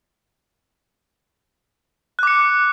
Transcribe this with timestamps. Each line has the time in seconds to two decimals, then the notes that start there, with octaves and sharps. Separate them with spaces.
2.19 F#6
2.23 D6
2.27 C#7